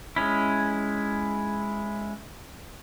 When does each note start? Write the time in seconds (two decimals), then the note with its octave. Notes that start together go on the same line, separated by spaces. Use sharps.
0.16 G#3 C#4 E4